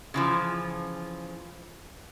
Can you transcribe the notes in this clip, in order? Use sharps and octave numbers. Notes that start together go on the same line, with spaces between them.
C#3 E3 F3